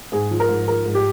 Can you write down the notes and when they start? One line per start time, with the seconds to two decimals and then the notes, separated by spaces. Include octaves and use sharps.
0.12 G#2 G#4
0.31 F3
0.40 A#4
0.49 G#2
0.68 F3 A#4
0.86 G#2
0.95 G4